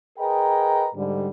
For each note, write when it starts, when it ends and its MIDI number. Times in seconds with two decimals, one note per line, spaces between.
0.19 0.88 68
0.19 0.88 70
0.19 0.88 71
0.19 0.88 75
0.19 0.88 79
0.19 0.88 82
0.94 1.28 44
0.94 1.28 50
0.94 1.28 55